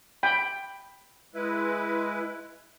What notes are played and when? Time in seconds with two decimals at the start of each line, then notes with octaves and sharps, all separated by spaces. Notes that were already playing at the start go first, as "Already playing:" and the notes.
0.23 G5 B5
1.34 G#3 E4 B4